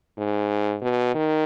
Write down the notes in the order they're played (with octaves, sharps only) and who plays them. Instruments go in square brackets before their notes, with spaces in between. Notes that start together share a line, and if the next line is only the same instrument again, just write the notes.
[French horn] G#2
B2
D#3